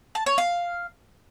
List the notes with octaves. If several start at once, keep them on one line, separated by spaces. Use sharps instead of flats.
A5
C#5
F5